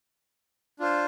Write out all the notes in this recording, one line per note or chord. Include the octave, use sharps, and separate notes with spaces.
D4 F4 C5